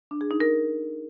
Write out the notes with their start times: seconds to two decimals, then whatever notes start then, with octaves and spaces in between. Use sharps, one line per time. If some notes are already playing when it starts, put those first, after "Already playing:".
0.11 D4
0.21 G#4
0.31 D#4
0.40 A#4